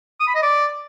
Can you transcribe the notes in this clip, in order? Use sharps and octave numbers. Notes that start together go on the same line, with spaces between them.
D#6
B5
D#5
D5